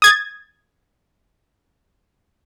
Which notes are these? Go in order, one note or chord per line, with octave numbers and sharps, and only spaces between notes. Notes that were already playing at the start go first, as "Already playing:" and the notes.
D#6 G#6 A6